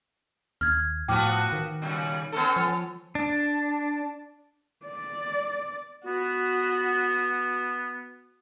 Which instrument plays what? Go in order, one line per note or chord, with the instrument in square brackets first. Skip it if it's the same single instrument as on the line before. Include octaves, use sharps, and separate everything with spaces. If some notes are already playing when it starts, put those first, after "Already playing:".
[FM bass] D#2 [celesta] F6 G#6
[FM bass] A2 [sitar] F3 B3 F#4 [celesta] G5 D6 F6
[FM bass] D#3
[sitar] A#2 C#3 G3
B3 C#4 A4
[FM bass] F3
[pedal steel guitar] D4
[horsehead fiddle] D5
[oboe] B3 [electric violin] F#4